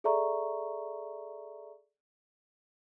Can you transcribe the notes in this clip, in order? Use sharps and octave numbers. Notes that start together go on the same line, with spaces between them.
G#4 A4 D5 E5 A#5 C#6